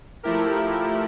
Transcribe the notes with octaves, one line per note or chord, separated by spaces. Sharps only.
F3 A3 E4 G4 A#4